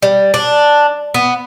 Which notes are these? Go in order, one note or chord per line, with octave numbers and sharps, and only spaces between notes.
G3
D4
B3